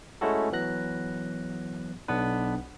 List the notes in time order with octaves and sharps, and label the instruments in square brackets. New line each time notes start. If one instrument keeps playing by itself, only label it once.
[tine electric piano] G#3 A3 C#4 E4 F#4 A4
E3 F#3 B3 F#6 A#6
B1 B3 D4 B4